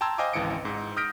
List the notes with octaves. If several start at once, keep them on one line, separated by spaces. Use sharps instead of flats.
G5 A5 A#5 C6 E6 G#6
C5 D#5 F5 G5 G#5 D6
G#1 C#2 E3 D#5 C#7 D7
G#2
D#6 F6 G6 A#6 B6 D7